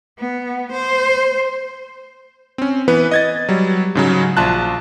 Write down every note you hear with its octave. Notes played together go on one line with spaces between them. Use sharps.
B3
C5
C4 C#4
E3 B3 B4
D#5 G#6 A6
F#3 G3
G#2 C#3 F#3
A#1 F4 A5 F#6